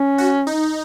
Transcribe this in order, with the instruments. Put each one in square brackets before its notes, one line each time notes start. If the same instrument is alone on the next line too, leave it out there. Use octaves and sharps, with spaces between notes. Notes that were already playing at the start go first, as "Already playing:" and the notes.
Already playing: [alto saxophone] C#4
[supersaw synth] F#4
D#4